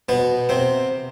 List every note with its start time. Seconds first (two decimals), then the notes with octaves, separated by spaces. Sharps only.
0.09 B2 B3
0.49 C3 C4